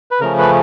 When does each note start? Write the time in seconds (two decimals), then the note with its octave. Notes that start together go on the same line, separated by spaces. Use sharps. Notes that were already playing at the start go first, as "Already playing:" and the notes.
0.11 B4
0.20 C#3 F3 A3 C#4 A#4
0.38 B4